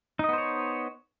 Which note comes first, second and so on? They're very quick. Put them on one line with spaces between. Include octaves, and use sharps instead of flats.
D#4 D#5 B3 C5 C#5